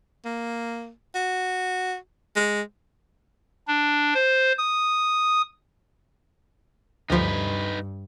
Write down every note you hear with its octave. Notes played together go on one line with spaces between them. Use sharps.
A#3
F#4
G#3
D4
C5
D#6
D2 G2 F3 D#4 B4